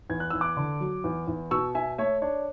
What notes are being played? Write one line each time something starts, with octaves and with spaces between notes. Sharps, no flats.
E2 G#6
F#6
E2 E6
D6 F#6
D3
F#3
E2
E2
B2 C#6 E6
B2 E5 G#5
A3 C#5 E5
D4 C#5